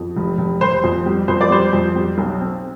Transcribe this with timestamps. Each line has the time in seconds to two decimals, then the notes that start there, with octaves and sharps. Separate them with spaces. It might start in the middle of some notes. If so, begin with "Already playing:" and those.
Already playing: F2
0.17 F1
0.38 F1
0.61 F1 C5
0.84 F2
1.06 G3
1.28 F2 C5
1.41 D5
1.51 G3 C5
1.73 F2
1.95 G3
2.18 B1
2.41 C4